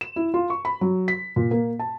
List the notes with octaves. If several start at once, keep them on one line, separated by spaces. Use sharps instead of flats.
E7
E4
F4
C#6
B5
F#3
B6
A#2
A#3
A5